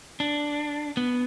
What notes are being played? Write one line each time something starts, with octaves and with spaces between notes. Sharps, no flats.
D4
B3